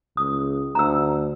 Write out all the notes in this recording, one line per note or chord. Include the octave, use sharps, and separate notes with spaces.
C#2 D#6
D2 A#5 E6